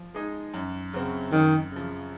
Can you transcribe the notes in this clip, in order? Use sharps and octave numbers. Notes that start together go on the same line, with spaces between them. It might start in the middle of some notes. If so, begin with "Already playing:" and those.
Already playing: F3
G#3 D#4 G#4
F#2
C#3 F#3 C4
F#2 D#3
C#3 F3